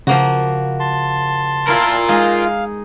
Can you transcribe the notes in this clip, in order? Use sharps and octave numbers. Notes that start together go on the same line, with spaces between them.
C#3 F3 A#3 F#4
A5 C6
E4 F4 A#4
G#3 D#4 F5